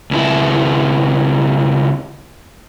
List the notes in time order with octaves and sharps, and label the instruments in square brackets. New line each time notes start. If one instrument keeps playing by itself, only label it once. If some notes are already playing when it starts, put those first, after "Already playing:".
[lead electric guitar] C#2 E4